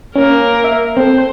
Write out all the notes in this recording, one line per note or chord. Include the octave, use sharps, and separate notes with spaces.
A#3 C#4 A#4
E5
C4 A4 C5